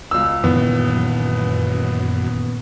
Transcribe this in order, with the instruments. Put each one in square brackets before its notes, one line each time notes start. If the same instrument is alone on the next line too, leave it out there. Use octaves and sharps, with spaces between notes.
[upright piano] C#2 E6
[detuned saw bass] F#2 [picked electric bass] A#2 D#3 E3 [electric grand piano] B3